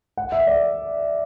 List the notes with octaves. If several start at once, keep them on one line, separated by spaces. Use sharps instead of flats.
F#5
E5
D5